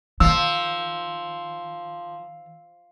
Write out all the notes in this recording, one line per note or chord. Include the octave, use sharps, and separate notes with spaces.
D#3 F3 E6